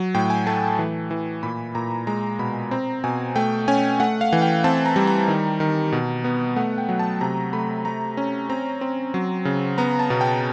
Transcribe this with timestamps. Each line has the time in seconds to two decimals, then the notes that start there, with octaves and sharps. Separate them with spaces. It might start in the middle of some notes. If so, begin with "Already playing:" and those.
Already playing: F#3
0.14 A2 G5
0.30 G#5
0.46 A3 A5
0.79 E3
1.11 E3
1.43 A#2 B5
1.75 A#2 A#5
2.07 G#3 A#5
2.39 B2 B5
2.71 C4 A#5
3.04 B2 G#5
3.36 A3 G5
3.68 C#4 G#5
4.00 A3 F#5
4.21 F5
4.33 E3
4.42 G5
4.64 C4 A5
4.86 A#5
4.96 G3
5.07 A#5
5.28 D#3
5.60 D#3
5.92 B2
6.24 B3
6.56 A3 F#5
6.78 G5
6.89 F#3
6.99 A5
7.21 C3 A#5
7.53 A3 B5
7.85 A3 A#5
8.17 C#4
8.49 C4 A#5
8.81 C4
9.14 F#3
9.45 C#3
9.78 B3 A#5
9.99 A5
10.10 B2
10.21 G5